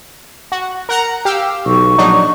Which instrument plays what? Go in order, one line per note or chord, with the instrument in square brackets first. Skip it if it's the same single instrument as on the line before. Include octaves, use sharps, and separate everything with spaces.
[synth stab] F#4
A#4 F#5 A#5
G4 F5 E6
[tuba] B1 [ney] C#6
[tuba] A#1 [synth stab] F#3 D4 D#4